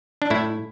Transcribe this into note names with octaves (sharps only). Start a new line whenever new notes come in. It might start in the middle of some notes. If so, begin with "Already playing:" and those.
D4
A2 E4